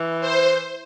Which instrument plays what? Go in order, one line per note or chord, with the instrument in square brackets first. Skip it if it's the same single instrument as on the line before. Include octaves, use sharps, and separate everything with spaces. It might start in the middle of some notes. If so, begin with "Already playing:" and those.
Already playing: [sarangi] E3
[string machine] C5